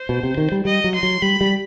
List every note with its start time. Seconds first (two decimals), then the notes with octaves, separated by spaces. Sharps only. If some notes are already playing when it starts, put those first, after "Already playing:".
Already playing: C5
0.09 B2
0.23 C3
0.37 D#3
0.52 G3
0.65 G3 D#5
0.84 F#3
0.94 C6
1.03 F#3
1.22 G3 B5
1.41 G3